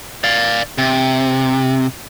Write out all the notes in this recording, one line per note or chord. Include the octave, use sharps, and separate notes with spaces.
D5 F5
C3